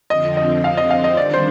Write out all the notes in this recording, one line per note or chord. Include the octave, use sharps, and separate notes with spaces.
F2 D3 F3 C4 D#5
D#5
F5
D#5
F5
D#5
D#3 G3 D4 D5
C5